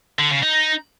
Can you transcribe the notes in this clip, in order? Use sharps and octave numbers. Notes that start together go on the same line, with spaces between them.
D3
C#3
D#4